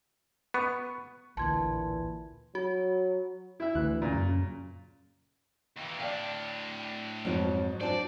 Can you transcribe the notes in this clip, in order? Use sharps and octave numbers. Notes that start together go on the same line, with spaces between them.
B3 C#6
A1 D2 A#2 D3 E3 A5 C6 G#6
F#3 F#4
E4 E5
D2 E3 F#6
A#2 C#3
F#2
D#2 E3
A2 D4 D5 F5 G5
F2 G#2 F3 F#3 C#5
F#3 D4 C5 D5 A5